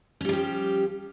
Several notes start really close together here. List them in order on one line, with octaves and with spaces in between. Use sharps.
C#4 G3 F3 G4